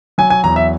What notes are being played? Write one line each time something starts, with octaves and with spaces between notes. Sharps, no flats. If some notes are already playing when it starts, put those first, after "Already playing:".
F#3 G#5
G#5
E2 A#5
E5